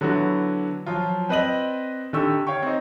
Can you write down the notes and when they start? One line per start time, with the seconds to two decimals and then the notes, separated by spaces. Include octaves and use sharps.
0.01 D3 F#3 B3 E4 F#4
0.86 F3 F#3 F4
1.29 C4 B4 D5 D#5 D#7 F#7
2.13 D3 D#3 G4 C#6 E6
2.47 C#5 F5 G5 C#6
2.62 C4 D#4